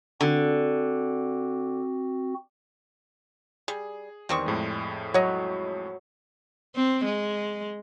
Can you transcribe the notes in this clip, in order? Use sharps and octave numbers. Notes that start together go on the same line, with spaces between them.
D3 C4 F#4
G3 G#4
E2 D#3 G3 C4 C#6 D#6
F2 A2 G#3
F#3 C#5 D#5
C4
G#3